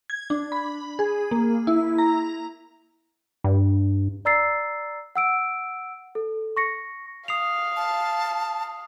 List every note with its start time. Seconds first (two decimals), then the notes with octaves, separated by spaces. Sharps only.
0.10 G#6
0.30 D4
0.52 B5
0.99 G#4
1.31 A#3
1.67 E4
1.98 A#5
3.44 G2
4.25 D5 A#5 E6 A6 C7
5.16 F#5 E6 D7
6.15 A4
6.57 C#6 A#6 C#7
7.28 F5 D#6 C7 F7
7.76 A5